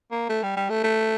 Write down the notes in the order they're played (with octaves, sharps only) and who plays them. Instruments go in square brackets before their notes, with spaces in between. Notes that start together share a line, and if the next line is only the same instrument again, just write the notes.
[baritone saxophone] A#3
A3
G3
G3
A3
A3